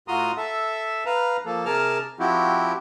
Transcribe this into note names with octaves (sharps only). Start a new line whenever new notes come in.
A2 F4 F#4 A#5 C6 D#6
A4 E5
B4 F5 A#5
F3 A#3 A4
C3 G#4 A#4 A5 F6
F3 C4 E4 F#4 G4